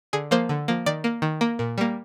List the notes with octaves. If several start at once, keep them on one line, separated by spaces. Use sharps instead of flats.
D3 G#4
F3 A#3 C5
D3
F3 A#3
D#3 D5
A#3
D#3
A#3
A#2
G3 A#3